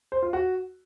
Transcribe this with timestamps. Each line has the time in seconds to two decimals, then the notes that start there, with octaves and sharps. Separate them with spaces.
0.12 C5
0.23 F4
0.33 F#4